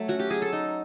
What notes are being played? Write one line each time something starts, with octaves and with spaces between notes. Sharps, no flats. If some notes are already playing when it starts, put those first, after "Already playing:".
Already playing: F#3 A3
C#4 F#4
G4
F#3 G#4
A4
D#4